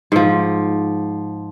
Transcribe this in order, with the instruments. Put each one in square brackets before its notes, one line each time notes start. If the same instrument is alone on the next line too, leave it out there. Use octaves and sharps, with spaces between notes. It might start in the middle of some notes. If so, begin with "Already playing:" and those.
[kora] G#2 F3